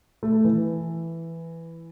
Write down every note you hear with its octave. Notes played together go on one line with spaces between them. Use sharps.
A3
E3